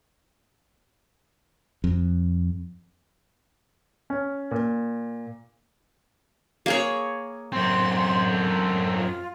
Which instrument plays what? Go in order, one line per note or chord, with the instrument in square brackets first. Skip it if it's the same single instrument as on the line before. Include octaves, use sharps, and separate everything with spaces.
[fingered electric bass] F2
[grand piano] C#4
A#2
[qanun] A#3 G#4 C#5
[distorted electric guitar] F#2 C4 [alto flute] C6
[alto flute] A4
F4